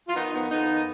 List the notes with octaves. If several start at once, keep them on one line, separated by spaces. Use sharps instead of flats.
F4
D#3 B3 D#4
F2 B3 D#4
F2 B3 D#4
D#3